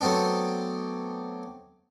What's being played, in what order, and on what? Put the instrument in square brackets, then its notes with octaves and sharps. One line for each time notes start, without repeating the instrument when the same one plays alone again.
[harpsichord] F#3 A3 B3 C4 D4